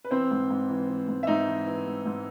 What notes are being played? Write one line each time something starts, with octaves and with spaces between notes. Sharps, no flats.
B4
E3 C4 C5
G#2
G#2
E3
E3
G#2
E5
G#2 D#4 D#5
E3
E3
G#2
G#2